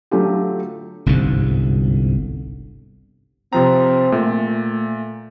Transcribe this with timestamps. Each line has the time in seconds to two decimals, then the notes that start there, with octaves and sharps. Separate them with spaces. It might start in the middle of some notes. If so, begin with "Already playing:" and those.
0.11 D3 F#3 A3 F4 G4
1.06 G1 C2 G#2 D3
3.53 C3 F3 C4 A#5
4.12 A#2 A3